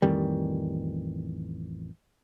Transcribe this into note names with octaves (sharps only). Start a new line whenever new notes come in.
A1 F2 D#3 G3